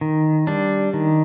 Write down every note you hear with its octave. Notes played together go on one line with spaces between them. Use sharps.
D#3
G3 D4
D#3